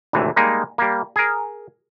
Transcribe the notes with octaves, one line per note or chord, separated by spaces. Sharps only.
G#1 D2 A2 C3 E3
G3 G#3 A#3 D#4
G3 A#3
G#4 A#4